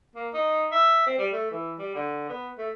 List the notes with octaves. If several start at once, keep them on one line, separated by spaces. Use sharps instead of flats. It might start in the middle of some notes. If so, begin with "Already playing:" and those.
A#3
D#4
E5
C4
G3
A3
E3
G3
D3
B3
A3